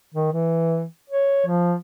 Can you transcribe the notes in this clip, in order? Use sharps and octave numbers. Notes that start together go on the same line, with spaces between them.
D#3
E3
C#5
F3